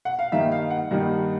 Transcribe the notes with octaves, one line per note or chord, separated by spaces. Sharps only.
F#5
F5
G2 D#3 G3 A#3 D#4 E5
F5
F#5
G2 D#3 G3 A#3 D#4